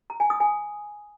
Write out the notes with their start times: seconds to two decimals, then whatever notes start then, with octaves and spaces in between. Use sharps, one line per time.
0.10 A#5
0.20 G#5
0.30 D#6
0.40 G#5